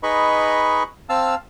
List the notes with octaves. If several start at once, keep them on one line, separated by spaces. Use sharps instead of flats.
D#4 G#4 B4 D#5 B5 C#6
C4 F5 A5 E6 F6